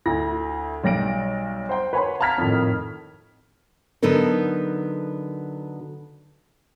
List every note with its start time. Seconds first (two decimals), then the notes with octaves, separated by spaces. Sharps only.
0.06 D2 E4 A#6
0.84 B1 G3 A#6 D7
1.69 C5 F#5 G5 C6
1.93 B4 C#5 F#5 G#5 B5 C6
2.20 F5 A5 A#5 F6 G#6 B6
2.38 F2 A2 D#3
4.02 D3 F#3 B3 D#4 A4 A#4